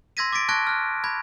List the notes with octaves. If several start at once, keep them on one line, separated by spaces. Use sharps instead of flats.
C6 E6 G#6 A#6 B6 D#7
D6 A6 B6 D7
A5 C#6 F#6 G#6 A#6 D7
F6 F#6
B5 G#6